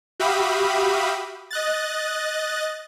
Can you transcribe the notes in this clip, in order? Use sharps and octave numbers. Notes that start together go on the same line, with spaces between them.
F#4 G4 E5 F5 B5 D#6
D#5 F#6 A6